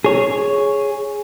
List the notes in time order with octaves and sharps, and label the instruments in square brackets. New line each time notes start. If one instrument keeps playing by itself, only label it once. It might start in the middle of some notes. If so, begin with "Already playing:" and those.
[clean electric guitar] G#4 C#5